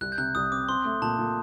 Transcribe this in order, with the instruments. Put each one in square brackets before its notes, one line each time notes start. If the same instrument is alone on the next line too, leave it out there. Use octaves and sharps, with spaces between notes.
[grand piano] C2 [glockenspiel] F#6
[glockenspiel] G6
[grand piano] C3 [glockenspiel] F#6
[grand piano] C2 [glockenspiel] D#6
[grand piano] C4 [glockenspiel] D6
[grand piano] C4 [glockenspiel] C6
[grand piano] A3
[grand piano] A#2 [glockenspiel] A5
[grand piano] A#2